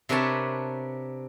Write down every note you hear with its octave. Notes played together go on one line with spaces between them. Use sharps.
C3 D4 A#4 B4 C#5 A5